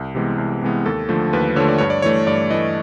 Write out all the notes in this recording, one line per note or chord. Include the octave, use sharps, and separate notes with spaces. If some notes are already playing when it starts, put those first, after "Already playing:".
Already playing: C2
C3 E3 G#3 B3
C2
C3 E3 G#3 B3
D#2 A4
D3 F3 A3
D#2 B4
D3 F3 A3 C#5
D5
G2 C#5
D5
E3 A3 C#5
G2 D5
E3 A3 D#5